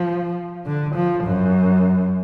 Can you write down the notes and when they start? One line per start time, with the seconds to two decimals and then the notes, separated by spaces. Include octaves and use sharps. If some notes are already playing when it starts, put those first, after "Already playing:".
Already playing: F3
0.66 D3
0.95 F3
1.24 F#2